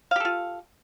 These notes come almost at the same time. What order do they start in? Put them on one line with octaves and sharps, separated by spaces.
F5 G4 A4 F4